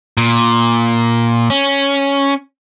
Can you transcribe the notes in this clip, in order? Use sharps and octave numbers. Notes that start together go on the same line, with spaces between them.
A#2
C#4